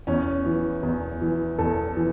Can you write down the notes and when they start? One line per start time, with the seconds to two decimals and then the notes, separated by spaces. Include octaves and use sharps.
0.07 E2 C#4
0.46 E3
0.83 E2
1.21 E3
1.58 E2 A4
1.96 E3